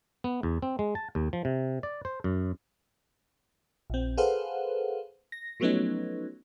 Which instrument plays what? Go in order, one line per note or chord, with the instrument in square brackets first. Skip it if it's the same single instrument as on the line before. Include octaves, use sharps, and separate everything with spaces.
[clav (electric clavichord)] B3
E2
C4
G#3
A5
D#2
F3
C3
D5
C5
F#2
[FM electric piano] A#1 C4
G#4 A4 B4 C5 F5 F#5
A#6
F3 F#3 A3 B3 C#4 D#4